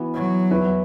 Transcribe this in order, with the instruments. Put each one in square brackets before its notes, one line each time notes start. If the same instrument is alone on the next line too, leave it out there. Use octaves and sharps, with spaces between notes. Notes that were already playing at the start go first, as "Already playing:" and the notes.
Already playing: [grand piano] E3 B3 F#4
[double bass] F#3
[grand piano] E2 E3 B3 E4 B4